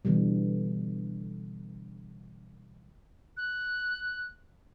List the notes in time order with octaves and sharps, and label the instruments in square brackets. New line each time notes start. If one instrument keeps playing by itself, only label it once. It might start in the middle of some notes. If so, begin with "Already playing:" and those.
[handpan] B2 D3 E3 G3
[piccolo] F#6